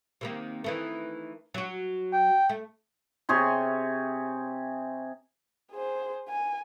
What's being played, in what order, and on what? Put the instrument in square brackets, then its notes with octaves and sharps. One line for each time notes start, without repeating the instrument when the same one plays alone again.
[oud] C3 D#3 A#3
D#3 E3 A3
F#3 F#4
[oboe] G5
[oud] A3
[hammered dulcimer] C3 G#4 C#5 C6
[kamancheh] G#4 C5
G#5